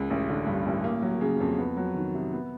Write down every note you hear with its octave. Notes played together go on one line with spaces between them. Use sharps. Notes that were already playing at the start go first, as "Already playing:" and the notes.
Already playing: C#2
A1
D3
G2
A1
A#3
F#3
C#3
F2
B3
F#3
D#3
C3
B3